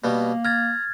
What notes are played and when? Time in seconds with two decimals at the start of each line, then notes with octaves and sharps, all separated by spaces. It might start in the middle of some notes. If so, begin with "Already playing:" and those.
0.04 B2 G3 A#3 B3
0.45 A#5 F6 G#6 A6